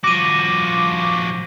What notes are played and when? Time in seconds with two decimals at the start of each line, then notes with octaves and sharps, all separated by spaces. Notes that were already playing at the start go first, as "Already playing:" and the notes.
0.04 F3 F#4 D6 A#6 D#7